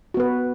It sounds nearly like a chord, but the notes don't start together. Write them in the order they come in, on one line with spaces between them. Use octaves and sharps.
F#4 B3 B4